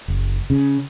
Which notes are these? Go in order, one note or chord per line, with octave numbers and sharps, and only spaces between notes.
F#1
C#3